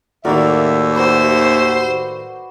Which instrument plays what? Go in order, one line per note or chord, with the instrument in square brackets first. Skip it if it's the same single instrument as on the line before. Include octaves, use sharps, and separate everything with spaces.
[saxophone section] D#2 E5 [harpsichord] A2 D#3 A#3 [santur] F#4 A#4 D5
[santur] F#4 B4 [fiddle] C5